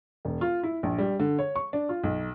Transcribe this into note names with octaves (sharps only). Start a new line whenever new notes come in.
E1
F4
E4
A#1
G3
D3
C#5
C#6
D4
F4
B1